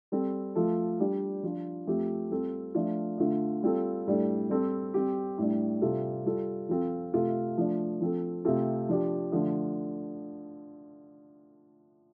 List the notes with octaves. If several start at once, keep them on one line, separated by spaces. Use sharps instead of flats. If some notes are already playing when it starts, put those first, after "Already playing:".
G3 C4 A4
F3 A3 F4 A4
G3 D4 G4
F3 D4 F4
F3 A3 C4 G4
G3 C4 F4 A4
F3 A3 D4 F4
D3 A3 F4
G3 C4 F4 A4
A2 G3 D4 A4
G3 C4 A4
G3 C4 G4
A2 G3 D4
C3 G3 F4 A4
G3 F4 A4
F3 C4 F4 A4
C3 A3 F4 A4
F3 A3 D4
F3 C4 A4
C3 A3 C4 F4 A4
F3 D4 G4
D3 F3 A3 D4